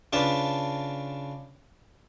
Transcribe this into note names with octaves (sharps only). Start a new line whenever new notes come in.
C#3 D4 F4 B4 A5